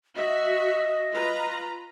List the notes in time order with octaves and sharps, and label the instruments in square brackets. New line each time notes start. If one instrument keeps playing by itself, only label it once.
[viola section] F#4 E5 [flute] D#5
[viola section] F4 B4 A#5